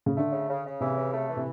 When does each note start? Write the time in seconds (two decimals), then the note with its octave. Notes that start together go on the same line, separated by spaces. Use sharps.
0.06 C#3
0.17 D3 A3
0.32 C#3
0.49 C#3
0.66 C#3
0.81 C3 E3
0.97 C#3
1.13 A3
1.29 E3
1.37 C3